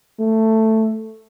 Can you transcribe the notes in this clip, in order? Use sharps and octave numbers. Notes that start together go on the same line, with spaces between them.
A3